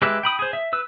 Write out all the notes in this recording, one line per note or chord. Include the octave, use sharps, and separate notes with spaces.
G#3 G4 B4 E5
G5 B5 D#6
G#4 C5
E5
B4 E6